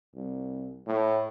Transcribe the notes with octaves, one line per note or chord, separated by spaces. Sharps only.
C2
A2